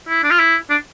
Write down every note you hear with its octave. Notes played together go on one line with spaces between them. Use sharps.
E4
D4
F4
E4
D4